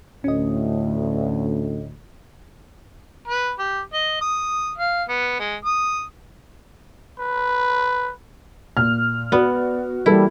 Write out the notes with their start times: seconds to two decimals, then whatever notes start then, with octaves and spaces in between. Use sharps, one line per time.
0.24 D2 A2 C#4 D#5
3.28 B4
3.59 G4
3.93 D#5
4.21 D#6
4.78 F5
5.09 B3
5.39 G#3
5.65 D#6
7.19 B4
8.77 A#2 F6
9.32 B3 F#4 D5
10.06 E3 G3 A#3 E4 A4